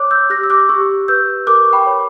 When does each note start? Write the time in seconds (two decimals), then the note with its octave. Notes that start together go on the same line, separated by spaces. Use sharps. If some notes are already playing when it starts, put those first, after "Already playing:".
Already playing: C#5 D6 F#6
0.11 E6 G6
0.30 G4 F#6 A#6
0.43 E6
0.50 D6 F#6
0.69 G4 C#6 E6
1.08 B4 E6 G6
1.47 A#4 D6 F#6
1.65 C#6
1.73 G5 B5
1.86 C#5